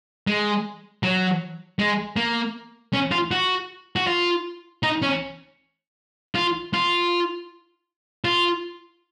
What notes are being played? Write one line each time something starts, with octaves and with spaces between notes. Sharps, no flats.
G#3
F#3
G#3
A#3
C#4
F4
F#4
F#4
F4
D#4
C#4
F4
F4
F4